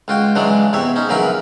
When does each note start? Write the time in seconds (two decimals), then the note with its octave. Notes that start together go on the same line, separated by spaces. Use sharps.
0.08 C#2 F4 F#4 G5
0.35 C#3 E3 F#3 G#3 D4
0.73 E2 C3 C#5 E5
0.96 C#4 D#4
1.09 A#1 C#3 E3 F#3 A#4 B5